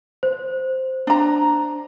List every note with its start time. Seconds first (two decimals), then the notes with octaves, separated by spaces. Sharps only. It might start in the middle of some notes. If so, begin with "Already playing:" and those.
0.23 C5
1.07 D4 A#5